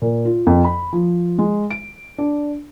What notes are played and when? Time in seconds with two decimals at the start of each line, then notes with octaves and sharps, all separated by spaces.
0.02 A#2
0.25 F4
0.47 F2
0.65 B5
0.93 F3
1.38 G#3
1.71 D7
2.18 D4